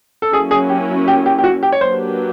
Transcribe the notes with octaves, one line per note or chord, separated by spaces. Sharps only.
A4
F#3 A#3 C#4 E4 G#4
G#4
G4
G4
G4
G4
F#4
G4
C#5
F#3 A#3 D4 G4 B4 C5